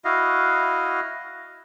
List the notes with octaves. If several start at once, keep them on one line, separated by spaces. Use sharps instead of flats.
E4 F#4 D#5 F5